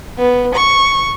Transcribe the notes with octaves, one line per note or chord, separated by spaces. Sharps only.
B3
C#6